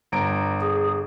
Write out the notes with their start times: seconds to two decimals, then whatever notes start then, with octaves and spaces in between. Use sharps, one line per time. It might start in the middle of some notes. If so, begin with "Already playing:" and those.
0.12 G1 A#5 D7
0.61 G#4